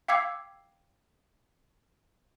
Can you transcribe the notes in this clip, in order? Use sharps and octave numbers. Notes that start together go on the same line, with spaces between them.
F5 G5 D6 E6 G#6 C7